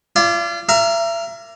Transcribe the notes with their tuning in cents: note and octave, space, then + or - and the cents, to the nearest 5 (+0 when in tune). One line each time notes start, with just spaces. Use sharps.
F4 -35 D5 +0
A#4 +0 E5 +35